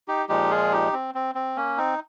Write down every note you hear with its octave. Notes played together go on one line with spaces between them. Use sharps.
D#4 G4
A#2 F3 G#3 D#4 G4
F4 G#4
D#4 G4
C4
C4
C4
A#3 C#4
C4 D#4